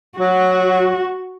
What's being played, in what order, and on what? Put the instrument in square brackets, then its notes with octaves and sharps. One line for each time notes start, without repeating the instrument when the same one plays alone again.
[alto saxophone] F#3 [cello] F#4